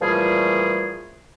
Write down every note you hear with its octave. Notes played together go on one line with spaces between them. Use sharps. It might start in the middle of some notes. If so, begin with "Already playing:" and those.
A#2 E3 F3 G3 A3 G#4